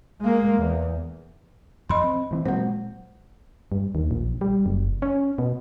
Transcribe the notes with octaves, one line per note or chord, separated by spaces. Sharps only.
G#3 A#3
E2
F2 D#5 B5 C6
C4
G2 E3 C4
A#2 F#3 G#3 C4 C5
G2
D#2
A#1
G3
F#1
C#4
B2